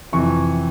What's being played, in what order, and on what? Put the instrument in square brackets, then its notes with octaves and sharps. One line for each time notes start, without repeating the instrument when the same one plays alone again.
[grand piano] F2 C3 E3 C#6